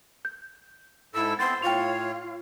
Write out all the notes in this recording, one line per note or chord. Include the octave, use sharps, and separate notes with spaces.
G6
G#2 E4 A4 E6
B3 C4 C6 A6
A2 F4 C#5 G5 F7